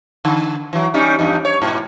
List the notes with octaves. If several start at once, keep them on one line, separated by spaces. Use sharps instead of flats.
D3
E3 F#3
G3 C#4 D#4
E2 G2 D#4
C#5
G#2 B2